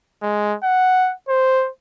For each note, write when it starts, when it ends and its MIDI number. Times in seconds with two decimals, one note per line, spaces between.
0.22 0.55 56
0.63 1.13 78
1.29 1.69 72